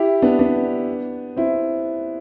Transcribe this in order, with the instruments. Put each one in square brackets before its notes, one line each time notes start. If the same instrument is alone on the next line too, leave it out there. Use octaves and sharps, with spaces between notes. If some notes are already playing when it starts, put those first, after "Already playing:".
Already playing: [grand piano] E4 G4
B3 D4
B3 D4
C4 E4